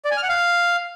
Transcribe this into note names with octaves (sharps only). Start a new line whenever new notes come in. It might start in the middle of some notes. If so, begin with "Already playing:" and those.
D5
G#5
F6
F#5
F5